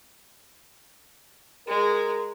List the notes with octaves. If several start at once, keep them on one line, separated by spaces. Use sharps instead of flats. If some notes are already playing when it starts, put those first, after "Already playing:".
G#3 A#4